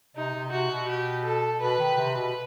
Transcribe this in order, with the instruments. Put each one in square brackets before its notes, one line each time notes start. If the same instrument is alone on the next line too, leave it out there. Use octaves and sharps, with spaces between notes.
[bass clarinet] C3 [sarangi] D#4
[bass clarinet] C3
[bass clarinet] C3 [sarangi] F#4
[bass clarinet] B2
[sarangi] G4
A4
[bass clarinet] B2 [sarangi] B4
[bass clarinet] D#3
C3
B2